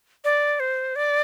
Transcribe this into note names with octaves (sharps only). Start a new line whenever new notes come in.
D5
C5
D5